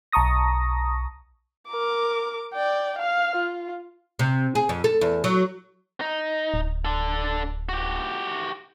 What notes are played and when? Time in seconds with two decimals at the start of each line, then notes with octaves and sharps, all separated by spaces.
0.12 B1 A5 A#5 C#6 D#6 A#6
1.68 A#4 D6
2.53 D5 G5
2.99 F5 F6
3.36 F4
4.19 C3
4.55 G#4
4.69 F2
4.84 A4
5.01 E2
5.24 F#3
6.01 D#4
6.54 D1
6.85 D4 A4
7.69 F#4 G4